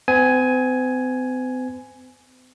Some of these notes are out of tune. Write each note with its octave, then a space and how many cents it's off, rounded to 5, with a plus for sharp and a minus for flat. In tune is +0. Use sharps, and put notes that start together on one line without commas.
C4 -45 G#5 +5